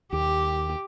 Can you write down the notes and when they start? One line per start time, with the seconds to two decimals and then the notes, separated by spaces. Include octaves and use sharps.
0.12 D#2 G4